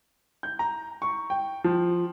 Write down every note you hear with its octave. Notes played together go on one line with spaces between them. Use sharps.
G6
A#5
C#6
G5
F3